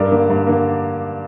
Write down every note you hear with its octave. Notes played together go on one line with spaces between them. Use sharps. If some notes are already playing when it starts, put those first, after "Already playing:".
Already playing: G2 A#4 D5
D3 A#3
G2
D3 A#3